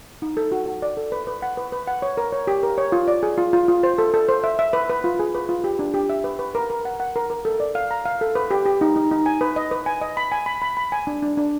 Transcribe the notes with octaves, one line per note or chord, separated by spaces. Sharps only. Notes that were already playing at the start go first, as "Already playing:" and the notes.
D#4
A4
F#4
F#4
D5
A4
B4
B4
F#5
B4
B4
F#5
C#5
A#4
C#5
G4
A#4
C#5
F4
D5
G#4
F4
F4
F4
C5
A4
A4
C5
E5
E5
B4
B4
F4
G#4
B4
F4
G4
D4
G4
E5
B4
B4
A#4
A#4
F#5
F#5
A#4
A#4
A4
D5
F5
A#5
F5
A4
B4
G4
G4
D#4
D#4
D#4
G#5
B4
D#5
B4
G#5
D#5
B5
G#5
B5
B5
B5
G#5
D4
D4
D4